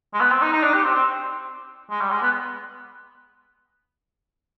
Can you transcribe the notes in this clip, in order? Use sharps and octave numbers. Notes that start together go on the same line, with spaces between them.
G#3
B3
C4
D#4
D#4
D4
G4
C4
C4
G#3
G3
G#3
B3